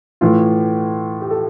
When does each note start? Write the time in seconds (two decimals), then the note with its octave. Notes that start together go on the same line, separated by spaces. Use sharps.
0.21 A2 E3 A3 F4
1.21 G4
1.31 A4